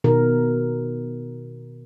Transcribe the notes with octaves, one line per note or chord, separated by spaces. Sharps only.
B2 D#3 A#4